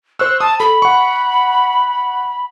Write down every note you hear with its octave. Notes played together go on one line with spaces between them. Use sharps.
C5 C#6 E6 F#6
A5 D#6
A4 B5
F#5 C#6